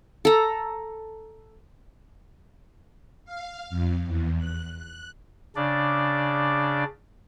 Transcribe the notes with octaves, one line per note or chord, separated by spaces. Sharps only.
A4 A#5
F5
F2
E2
F#6
F#6
C#3 D4 D5